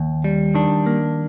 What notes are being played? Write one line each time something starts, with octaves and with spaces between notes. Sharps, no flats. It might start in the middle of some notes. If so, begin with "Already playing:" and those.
Already playing: D#2
G3
D#3 D4
A#3